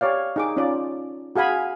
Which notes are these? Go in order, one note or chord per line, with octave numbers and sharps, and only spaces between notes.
G4 C#5 D5 F5
D#4 G#4 D6
C#4 D#4 F4 D5
F#4 G#4 F5 G#5 B5